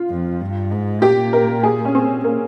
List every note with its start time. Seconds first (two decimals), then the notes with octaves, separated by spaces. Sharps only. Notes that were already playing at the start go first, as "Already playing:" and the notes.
Already playing: F4
0.10 F2
0.41 G2
0.71 G#2
1.02 A#2 G4
1.33 A#4
1.63 G#4
1.85 C#4
1.95 C4
2.24 A#3